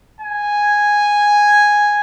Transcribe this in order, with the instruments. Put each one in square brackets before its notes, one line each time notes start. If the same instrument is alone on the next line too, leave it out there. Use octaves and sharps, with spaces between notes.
[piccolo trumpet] G#5